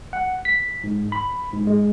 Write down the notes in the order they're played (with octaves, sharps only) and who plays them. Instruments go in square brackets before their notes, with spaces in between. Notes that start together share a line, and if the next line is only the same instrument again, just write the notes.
[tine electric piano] F#5
B6
G#2
B5
G#2
G#3